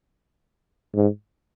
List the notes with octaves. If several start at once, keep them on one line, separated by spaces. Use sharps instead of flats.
G#2